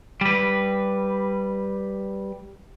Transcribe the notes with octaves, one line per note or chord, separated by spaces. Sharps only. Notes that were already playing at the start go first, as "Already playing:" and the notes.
G3 B4